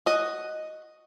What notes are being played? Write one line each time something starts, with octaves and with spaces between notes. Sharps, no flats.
F#4 D#5